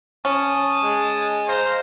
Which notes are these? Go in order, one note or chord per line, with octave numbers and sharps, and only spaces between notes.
C#4 A5 D#6
G#3
C5 F5 A#5